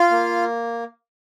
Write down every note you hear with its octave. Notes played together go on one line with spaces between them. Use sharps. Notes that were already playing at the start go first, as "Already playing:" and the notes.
Already playing: F4 F5
A#3